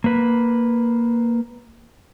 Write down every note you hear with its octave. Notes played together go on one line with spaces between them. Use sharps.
A#3 B4